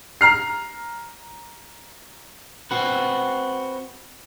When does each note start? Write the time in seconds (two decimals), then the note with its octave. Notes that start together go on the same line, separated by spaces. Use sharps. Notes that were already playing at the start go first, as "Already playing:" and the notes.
0.21 A#5 F6 C7
2.71 C4 F#4 B4